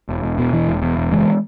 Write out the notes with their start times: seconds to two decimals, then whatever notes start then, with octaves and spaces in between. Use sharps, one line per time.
0.09 E1
0.23 E1
0.38 B2
0.53 E1 E3
0.68 E1
0.83 E2
0.97 E1
1.12 F#1 E3 G#3